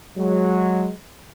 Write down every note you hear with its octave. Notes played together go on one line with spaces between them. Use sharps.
F#3 G#3